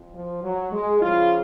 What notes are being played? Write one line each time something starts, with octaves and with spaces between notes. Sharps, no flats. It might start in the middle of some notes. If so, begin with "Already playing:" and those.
Already playing: F2
F3
F#3
G#3
F2 C#3 F3 F4